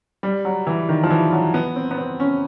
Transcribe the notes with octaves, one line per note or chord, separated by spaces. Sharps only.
G3
F#3
E3
D#3
F3
E3
F#3
B3
C4
B3
C4
C#4